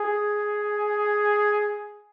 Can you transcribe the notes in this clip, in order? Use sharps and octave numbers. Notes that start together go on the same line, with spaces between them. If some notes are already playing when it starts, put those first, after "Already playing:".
Already playing: G#4